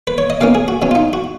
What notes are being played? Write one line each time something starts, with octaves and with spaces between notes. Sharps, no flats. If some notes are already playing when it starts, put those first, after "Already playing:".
B4
C#5
D#5
B2 A#3 C#4 F5
G#4
F#4
B2 F#3 C#4
F4
D#4
F#4